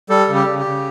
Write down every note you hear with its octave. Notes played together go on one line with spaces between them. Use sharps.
G3 A4
C#3
G4
C#3
G4
C#3